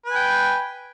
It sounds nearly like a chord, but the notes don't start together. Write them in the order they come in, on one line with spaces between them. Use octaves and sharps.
B4 G#5 G5